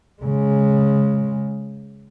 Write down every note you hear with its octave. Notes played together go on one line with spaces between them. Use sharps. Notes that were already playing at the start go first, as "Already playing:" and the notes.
C#3 G#3